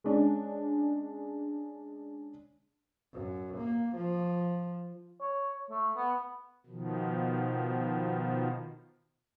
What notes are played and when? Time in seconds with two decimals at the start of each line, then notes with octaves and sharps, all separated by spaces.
0.04 G#3 C#4 D4
3.14 F#2
3.57 A#3
3.97 F3
5.21 C#5
5.70 A3
5.96 B3
6.66 B2 D#3 F3